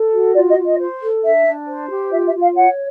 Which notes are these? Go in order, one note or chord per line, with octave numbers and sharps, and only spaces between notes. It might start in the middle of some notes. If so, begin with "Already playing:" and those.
Already playing: A4
F#4
F4 D5
D#5
F4
D#5
C5
A4
D4 E5
D4
C5
G4
F4 E5
E5
F4
F5
C#5 F#5